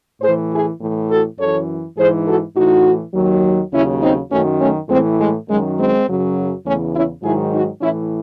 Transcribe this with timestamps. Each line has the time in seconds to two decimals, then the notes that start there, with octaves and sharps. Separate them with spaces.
0.22 A2 E3 G#4 C5
0.50 E4 G#4
0.80 A2 E3
1.09 F#4 A4
1.38 F#2 E3 A4 C#5
1.97 G#2 E3 G#4 C5
2.26 F#4 A4
2.55 A2 E3 D#4 F#4
3.14 D#2 D#3 F#3
3.72 D#2 C#3 F#3 C#4 E4
4.01 C4 D#4
4.30 F#2 D#3 F#3 A3 C#4
4.60 A3 C#4
4.89 A2 E3 G#3 C4
5.18 G#3
5.47 F#2 D#3 F#3 G#3
5.77 G#3 C4
6.06 F#2 C#3 F#3
6.64 E2 C#3 E3 A3 C#4
6.93 C#4 E4
7.22 G#2 D#3 F#3 E4 G#4
7.52 D#4 F#4
7.80 A2 E3 C#4 E4